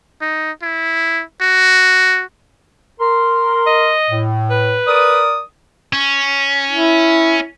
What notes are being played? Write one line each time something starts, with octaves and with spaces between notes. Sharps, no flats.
D#4
E4
F#4
A#4 C6
D#5
A2
B4
A#4 D5 D#6
C#4
E4